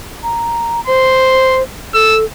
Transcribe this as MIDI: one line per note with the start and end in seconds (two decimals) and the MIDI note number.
0.23 0.81 82
0.87 1.63 72
0.87 1.60 84
1.94 2.24 69
1.94 2.19 88